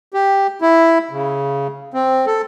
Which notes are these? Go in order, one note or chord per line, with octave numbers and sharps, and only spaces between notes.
G4
E4
C#3
C4
A4